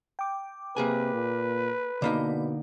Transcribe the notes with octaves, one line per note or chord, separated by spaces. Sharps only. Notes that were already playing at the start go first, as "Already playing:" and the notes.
G5 D6
C3 A#3 G#4 B4 G#5
A#2
B2 D3 A#3 D#4 D5 B5